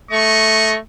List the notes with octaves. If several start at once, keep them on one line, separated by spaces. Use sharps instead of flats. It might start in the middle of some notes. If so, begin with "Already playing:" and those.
A3 D#5 C#6